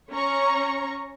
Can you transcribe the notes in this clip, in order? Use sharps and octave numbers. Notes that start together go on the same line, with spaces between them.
C#4 C#5 A#5 C#6